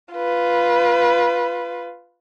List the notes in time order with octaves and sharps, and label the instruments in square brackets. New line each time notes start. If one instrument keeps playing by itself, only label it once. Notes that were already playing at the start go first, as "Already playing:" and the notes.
[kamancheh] F4 B4